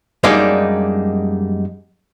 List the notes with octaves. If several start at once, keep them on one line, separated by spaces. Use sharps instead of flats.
F#2 G3 G#3 A#3 D4 D#4